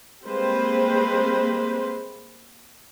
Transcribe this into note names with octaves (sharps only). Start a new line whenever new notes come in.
G3 G#3 A#3 C4 B4 C5